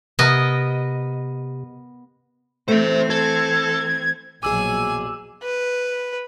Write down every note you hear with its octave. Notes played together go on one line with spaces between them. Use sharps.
C3 B3 A#4 D#5
E3 A3 C4 C5 E5
A4 G#6
A#1 E2 B2 F#3 G#4 G#5 D6 E6
B4